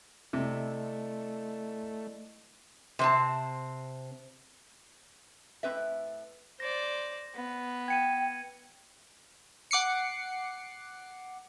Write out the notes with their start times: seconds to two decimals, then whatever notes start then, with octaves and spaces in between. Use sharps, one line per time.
0.33 C3 A3 E4 D5 D#5
2.99 C3 C4 A5
5.63 A2 C4 B4 E5
6.60 C5 D5 A#6
7.35 B3
7.88 G5 G#6 C#7 D#7
9.71 F#5 D6 C7 C#7